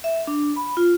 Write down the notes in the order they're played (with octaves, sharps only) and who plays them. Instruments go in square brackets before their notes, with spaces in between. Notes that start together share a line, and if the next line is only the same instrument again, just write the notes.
[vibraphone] E5
D4
B5
F4